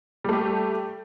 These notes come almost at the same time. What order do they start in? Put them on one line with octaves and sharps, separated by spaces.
G3 A3 G4